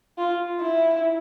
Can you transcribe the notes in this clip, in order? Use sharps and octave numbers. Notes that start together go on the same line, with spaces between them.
F4
E4